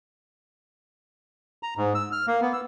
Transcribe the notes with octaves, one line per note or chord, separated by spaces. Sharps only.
A#5
G#2
E6
F6
A#3
B3
E6